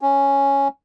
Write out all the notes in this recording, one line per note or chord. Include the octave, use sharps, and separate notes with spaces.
C#4